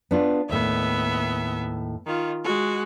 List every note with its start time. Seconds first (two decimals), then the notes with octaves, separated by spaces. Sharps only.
0.11 B3 D4 F4
0.49 D#2 A2 B3 E5
2.06 D#3 F4
2.44 G#3 F#4